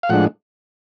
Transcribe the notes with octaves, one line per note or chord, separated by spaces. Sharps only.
F5
A2 F3 G#3 D4 F#5